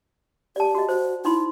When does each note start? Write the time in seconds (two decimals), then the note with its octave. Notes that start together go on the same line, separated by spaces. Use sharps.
0.56 G4 D5 A5
0.75 F#4 D#5
0.89 F#4 C5
1.25 D#4 E4 B5 C6